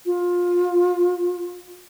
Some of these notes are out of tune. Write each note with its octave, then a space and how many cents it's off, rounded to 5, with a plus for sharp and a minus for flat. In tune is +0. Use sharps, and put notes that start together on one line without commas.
F4 +20